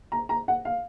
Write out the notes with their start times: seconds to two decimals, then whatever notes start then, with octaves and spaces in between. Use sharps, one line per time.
0.12 A#5
0.29 A#5
0.48 F#5
0.65 F5